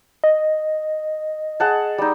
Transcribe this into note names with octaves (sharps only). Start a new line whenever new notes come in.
D#5
G#4 F#5 A5
G3 D#4